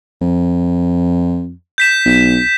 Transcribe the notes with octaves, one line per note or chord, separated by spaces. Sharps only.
F2
G6 B6 E7
B1